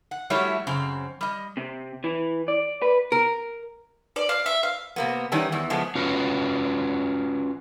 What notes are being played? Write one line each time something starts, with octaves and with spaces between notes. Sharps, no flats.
F#5
F#3 G3 A3 E4 G4 C#5
F#2 C#3 C4
G3 D#5
C3
E3
D5
B4
A#4
D5
F5
E5
F5
C3 A#3 B3
D#3 E3 G3 C#4
E2 E3
C#3 F3 G#3 A3 B3
C#4 F4 F#4 B4